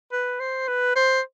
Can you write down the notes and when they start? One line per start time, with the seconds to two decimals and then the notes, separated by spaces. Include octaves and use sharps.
0.12 B4
0.40 C5
0.68 B4
0.96 C5